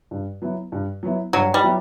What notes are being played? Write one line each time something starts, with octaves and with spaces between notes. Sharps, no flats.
G2
F#3 B3 E4
G2
F#3 B3 E4
G2 F#3
G3
F#3 B3 E4